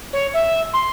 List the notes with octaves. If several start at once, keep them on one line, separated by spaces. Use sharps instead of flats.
C#5
E5
C6